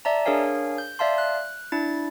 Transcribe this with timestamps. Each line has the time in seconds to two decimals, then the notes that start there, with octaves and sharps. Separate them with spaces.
0.05 D5 E5 A5 A#5
0.25 D4 G#4 A#4 C#5 F5 G#5
0.78 G6
0.99 D5 E5 F5 A5 C6
1.18 F#6
1.72 D4 E4 A6